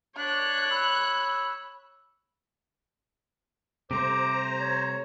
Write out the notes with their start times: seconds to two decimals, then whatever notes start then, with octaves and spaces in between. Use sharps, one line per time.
0.17 D4 C#5 F#6
0.71 B5 E6
3.91 C3 G3 A3 C5 A#5 D6
4.61 C#5